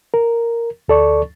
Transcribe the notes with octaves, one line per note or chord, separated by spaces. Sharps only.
A#4
D2 A4 D5 C#6